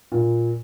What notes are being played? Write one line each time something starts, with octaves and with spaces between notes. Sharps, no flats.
A#2